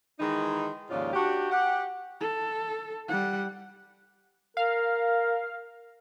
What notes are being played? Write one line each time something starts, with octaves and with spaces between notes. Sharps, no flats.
D#3 E3 G#3 D#4
D#2 G#2 C#3 F3 F4 D5
D4 F#4 G4
G4 F#5
A4
G3 F#5
A#4 F5